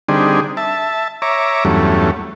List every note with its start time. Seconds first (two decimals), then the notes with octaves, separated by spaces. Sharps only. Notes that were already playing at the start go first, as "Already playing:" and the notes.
0.09 D3 G3 C4 D4 D#4 G#4
0.57 E5 A5
1.22 C#5 E5 A#5 D6
1.65 E2 G2 F#3 A3 C#4